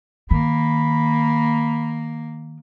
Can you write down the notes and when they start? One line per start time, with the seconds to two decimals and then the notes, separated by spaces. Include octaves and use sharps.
0.31 D#3 A#3 B5